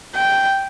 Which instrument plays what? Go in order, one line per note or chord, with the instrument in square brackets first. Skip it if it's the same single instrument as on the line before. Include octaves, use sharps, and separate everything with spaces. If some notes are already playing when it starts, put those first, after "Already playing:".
[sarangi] G5